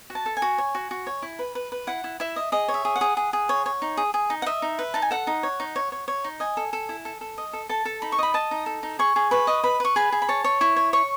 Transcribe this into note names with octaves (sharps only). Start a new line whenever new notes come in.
F#4
A5
A4
G#5
F#4
C#5
F#4
F#4
C#5
E4
B4
B4
B4
E4 F#5
E4
E4 E5
D#5
G#4 D#5
C#5
E5
G#4
F#5
G#4
G#4
G#4
C#5
C#5
D#4
G#4
G#4
D#4
F#5
D#5 E5
D#4
B4
D#4 A5
G#5
A4 F#5
D#4
C#5
D#4
C#5
C#5
C#5
D#4
D#5 G#5
A4
A4
E4
A4
A4
D#5
A4
A4 A5
A4
D#4 B5
C#6
D#5 B5
D#5 A5
D#4
A4
D#4
G#4 C#6
G#4
B4 C#6
D#5
B4 B5
B4 C#6
G#4 B5
G#4
B5
C#5 A5
C#5
E4 C#6
C#5
C#5 C#6